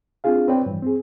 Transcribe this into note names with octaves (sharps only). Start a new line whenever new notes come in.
C4 D4 F4 G#4 F5
C4 B4 C#5 D5 G5
G2 E3
C4 G#4